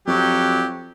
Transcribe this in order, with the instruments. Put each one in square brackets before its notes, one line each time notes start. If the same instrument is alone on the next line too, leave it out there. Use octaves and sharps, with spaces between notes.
[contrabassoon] F2 [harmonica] F#3 G4